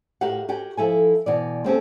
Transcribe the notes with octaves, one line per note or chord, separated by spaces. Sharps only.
A2 F#4 G4 A#4 F5 F#5
F#4 G4 A#4 G5 G#5
F3 E4 A4 G#5
B2 E3 D5
A#3 C4 C#4 A4